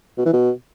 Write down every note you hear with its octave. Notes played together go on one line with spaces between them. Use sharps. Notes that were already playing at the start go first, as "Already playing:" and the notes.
B2
E3
B2